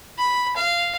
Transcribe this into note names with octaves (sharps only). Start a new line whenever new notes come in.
B5
F5